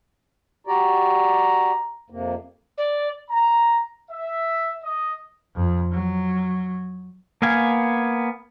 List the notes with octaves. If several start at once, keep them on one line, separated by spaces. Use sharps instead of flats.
F#4 G4 D5 A#5
F2 C3 A#3
D5
A#5
E5
D#5
F2
F#3
A#3 B3 F5 G#5